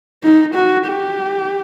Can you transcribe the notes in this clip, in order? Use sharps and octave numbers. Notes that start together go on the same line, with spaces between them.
D#4
F#4
G4